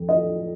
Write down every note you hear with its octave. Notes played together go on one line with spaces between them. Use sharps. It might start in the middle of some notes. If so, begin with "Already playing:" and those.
Already playing: F2
D#5